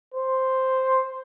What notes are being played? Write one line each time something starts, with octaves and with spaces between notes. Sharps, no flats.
C5